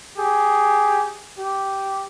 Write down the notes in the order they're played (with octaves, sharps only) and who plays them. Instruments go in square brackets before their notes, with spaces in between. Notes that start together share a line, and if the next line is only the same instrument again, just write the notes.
[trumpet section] G4 G#4
G4